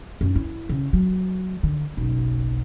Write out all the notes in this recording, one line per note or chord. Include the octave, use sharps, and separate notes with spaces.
F#2
E4
C#3
F#3
D3
F#1 B1